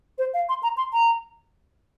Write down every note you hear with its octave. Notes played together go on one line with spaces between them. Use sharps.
C5
F5
C6
A#5
C6
A#5